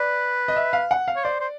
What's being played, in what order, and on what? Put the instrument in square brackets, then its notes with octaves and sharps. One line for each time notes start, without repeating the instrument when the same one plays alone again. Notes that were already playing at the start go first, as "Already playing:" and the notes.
Already playing: [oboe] B4 [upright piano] D5
[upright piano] D#5
E5
F5
F#5
F5
[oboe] C#5
[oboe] C5 [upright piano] D5
[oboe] C5